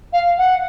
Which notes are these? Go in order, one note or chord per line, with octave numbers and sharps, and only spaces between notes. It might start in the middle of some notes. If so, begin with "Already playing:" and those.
F5
F#5